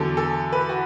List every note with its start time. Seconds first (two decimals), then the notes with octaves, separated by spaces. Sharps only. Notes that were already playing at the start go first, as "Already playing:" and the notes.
Already playing: E2 D3 F#3 A4
0.17 A4
0.53 B4
0.69 F#4